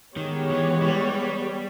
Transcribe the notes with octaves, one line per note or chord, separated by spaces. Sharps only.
D#3 G#3 B3 G4 C#5
E3
E3
G3